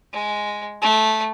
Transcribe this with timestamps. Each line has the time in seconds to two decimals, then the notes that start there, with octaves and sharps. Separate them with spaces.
0.13 G#3
0.82 A3